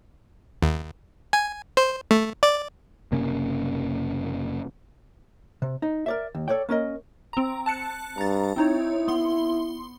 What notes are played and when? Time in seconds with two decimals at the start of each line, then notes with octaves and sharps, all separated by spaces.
0.63 D#2
1.33 G#5
1.77 C5
2.11 A3
2.43 D5
3.12 F#1 C3 A#3 C#4
5.62 C3
5.82 D#4
6.06 A#4 D5 E5
6.35 D#2
6.48 A4 B4 C#5 D5 G5
6.69 A#3 C#4 A#4 D#5
7.33 C4 A#5
7.66 A5 F#6 C#7
8.18 G2 A#5 A6
8.56 C4 D#4 E4 C#5
9.08 B3 C6 G7